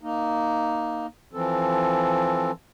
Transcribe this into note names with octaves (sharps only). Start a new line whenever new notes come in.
A#3 D#4
E3 F3 C4 A4